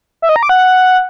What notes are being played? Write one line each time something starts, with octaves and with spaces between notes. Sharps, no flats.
E5
D#5
A#5
D6
F#5